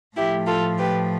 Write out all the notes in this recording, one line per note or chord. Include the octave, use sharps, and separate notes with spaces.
A2 F3 A3 E4 G4
F4 A4
G4 B4